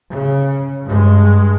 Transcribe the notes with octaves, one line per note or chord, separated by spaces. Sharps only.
C#3
G2 G#3